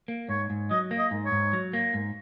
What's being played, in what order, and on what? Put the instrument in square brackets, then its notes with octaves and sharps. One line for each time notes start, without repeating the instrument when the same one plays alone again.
[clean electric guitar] A#3
[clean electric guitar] G#2 [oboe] C#5
[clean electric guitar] G#2
[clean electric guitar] F#3 [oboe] D#5
[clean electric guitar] A#3
[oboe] D#5
[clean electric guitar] G#2
[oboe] C#5
[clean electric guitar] G#2
F#3
A#3
G#2